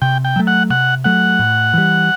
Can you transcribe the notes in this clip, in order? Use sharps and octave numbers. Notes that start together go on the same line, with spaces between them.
C3 G5
G5
F#3 A3
F#5
C3 F#5
F#3 A3 F#5
A2
E3 G3